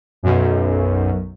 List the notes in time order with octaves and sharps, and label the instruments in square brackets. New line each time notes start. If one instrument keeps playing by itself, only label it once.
[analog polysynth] B1 F#2